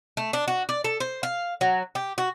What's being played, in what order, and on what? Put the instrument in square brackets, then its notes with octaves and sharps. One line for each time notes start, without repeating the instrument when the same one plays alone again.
[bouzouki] A3
D4
F#4
D5
A4
C5
F5
F#3
G4
F#4